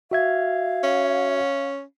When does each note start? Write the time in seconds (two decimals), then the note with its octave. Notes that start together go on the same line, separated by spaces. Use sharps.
0.11 F#4 E5 F5 G#6
0.83 C#4